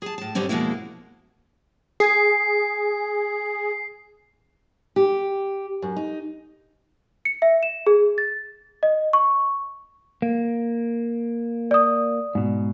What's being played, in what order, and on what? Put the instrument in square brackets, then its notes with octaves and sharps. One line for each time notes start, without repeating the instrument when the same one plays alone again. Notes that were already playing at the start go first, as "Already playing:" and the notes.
[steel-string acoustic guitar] G#4 A5
A2 A5
G2 B2 D3 G3 C4 C#4
F2 B2 D3 G#3 A#3 E4
[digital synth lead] G#4 [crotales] C7
[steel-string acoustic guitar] G4
F#2
D#4
[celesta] C#7
E5
E7
G#4
A6
D#5
C#6
[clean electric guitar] A#3
[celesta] D5 D#6
[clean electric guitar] G#2 B2